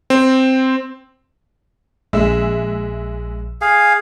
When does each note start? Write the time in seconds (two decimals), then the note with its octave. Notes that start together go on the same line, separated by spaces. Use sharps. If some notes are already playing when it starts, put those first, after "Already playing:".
0.10 C4
2.13 A#1 G#3 E5 E6
3.61 G#4 F5